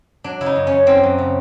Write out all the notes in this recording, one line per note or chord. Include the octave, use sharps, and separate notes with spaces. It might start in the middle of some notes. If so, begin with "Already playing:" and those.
F#3 D4
C#3 E4
D#4
F#2
C#4
F#2
F#2 C4
F#2
C#3